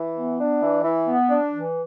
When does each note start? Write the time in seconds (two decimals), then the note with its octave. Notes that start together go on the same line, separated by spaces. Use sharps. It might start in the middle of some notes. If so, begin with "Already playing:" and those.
Already playing: E3
0.16 B3
0.38 D4
0.62 E3
0.84 E3
1.07 B3
1.29 D4
1.53 E3